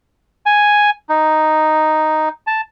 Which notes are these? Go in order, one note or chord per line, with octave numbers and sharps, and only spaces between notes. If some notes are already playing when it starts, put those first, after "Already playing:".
G#5
D#4
A5